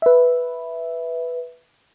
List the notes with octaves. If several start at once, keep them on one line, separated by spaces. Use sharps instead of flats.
B4 E5